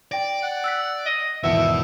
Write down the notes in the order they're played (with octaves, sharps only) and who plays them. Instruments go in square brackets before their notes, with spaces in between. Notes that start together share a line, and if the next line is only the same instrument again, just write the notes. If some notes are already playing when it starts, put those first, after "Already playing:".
[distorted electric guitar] D5 [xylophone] G5 A#6
[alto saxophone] F#5
[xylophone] E6 F#6 B6
[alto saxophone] D#5
[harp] G#1 E2 [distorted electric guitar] B2 B3 [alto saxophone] E5